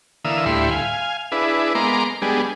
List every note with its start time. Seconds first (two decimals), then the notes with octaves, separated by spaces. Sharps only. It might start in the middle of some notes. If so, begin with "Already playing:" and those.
0.25 D3 E3 A#3 F5 D#6 E6
0.46 D2 A2 G3 E4 B5 C6
0.71 F5 G#5
1.32 D4 E4 G#4 B4
1.75 G#3 A#3 B3 A#5 C6 D6
2.22 G3 G#3 B3 D4 G#4